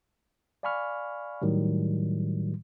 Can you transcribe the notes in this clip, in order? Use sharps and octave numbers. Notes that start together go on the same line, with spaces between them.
D5 F5 G#5 B5 C#6 F6
A2 D#3 F#3 G3